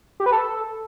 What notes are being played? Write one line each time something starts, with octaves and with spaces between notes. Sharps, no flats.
G4
B4
A4